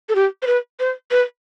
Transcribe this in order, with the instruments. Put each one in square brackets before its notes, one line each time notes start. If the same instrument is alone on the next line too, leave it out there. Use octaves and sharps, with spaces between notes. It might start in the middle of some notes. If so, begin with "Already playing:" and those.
[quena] A4
G4
C5
B4
C5
B4